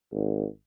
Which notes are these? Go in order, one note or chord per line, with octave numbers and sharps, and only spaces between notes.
G#1